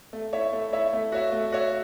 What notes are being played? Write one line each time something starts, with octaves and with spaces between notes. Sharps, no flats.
A3
E4 C#5 E5
A3
E4 C#5 E5
A3
F#4 C#5 E5
A3
F#4 C#5 E5